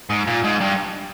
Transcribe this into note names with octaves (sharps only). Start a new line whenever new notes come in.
G#2
A#2
G#2
G2